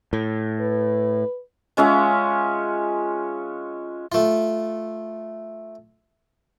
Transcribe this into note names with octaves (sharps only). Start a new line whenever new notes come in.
A2
B4
G#3 C#4 F4 E5
A3 F4